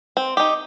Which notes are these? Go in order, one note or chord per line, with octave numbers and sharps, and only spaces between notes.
C4
D#4 G4